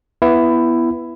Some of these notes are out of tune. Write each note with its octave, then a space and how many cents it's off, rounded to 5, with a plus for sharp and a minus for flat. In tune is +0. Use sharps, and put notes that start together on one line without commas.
B3 +0 E4 +15